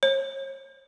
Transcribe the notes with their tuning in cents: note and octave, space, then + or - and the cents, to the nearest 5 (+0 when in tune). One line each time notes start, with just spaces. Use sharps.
C#5 -40